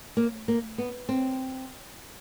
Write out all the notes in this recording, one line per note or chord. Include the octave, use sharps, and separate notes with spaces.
A#3
A#3
B3
C4